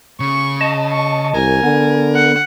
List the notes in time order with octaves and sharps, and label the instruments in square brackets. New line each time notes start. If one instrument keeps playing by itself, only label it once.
[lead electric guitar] C#3 [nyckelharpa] C#6
[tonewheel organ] D#5 A5
[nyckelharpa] C#6
[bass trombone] C2 [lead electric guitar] A#4 [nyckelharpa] G#5
[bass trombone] D3 [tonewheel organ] B3
[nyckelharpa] F#5